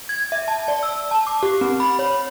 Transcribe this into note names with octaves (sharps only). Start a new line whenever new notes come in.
G#6
E5
A5
D5
E6
A5
D6
G4
C4
B5
C#5